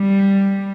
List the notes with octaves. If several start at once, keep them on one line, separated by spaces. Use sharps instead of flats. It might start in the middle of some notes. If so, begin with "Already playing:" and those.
Already playing: G3